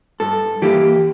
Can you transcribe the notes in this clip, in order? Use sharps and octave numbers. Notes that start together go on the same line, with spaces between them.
G2 A4
E3 A#3 E4 G4